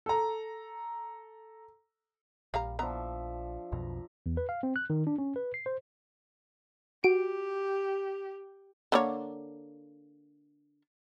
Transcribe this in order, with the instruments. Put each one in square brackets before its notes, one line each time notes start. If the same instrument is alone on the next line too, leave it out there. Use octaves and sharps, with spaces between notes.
[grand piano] A4 A#5
[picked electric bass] A#1 [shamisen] G3 F5 A#5
[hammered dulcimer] F3 D4 E5 [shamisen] B3 A#5
[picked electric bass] B1 F2 B2 [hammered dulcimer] A#5
[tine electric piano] E2
B4
F5
C4
F#6
D#3
D4
C#4
B4
C7
C5
[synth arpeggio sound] F#4 D7 [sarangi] G4
[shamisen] D3 A#3 C#5